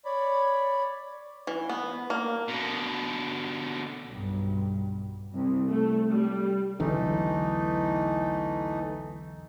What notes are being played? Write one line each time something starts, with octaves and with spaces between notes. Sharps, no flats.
C#5 D5 B5
E3
B3
A#3
B2 D3
B1 G2
C2
A3
G3
B1 E2 D3 E3 A3 D#4